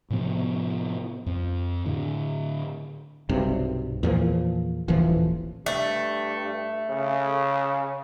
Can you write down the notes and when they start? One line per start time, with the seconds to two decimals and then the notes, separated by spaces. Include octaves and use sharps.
0.10 A2 C3 F3 B3
1.26 F2
1.85 A2 D3
3.29 B1 G2 C3
4.03 E2 A#2 F3
4.88 D#1 A1 E3 F3
5.66 G2 A3
6.90 C#3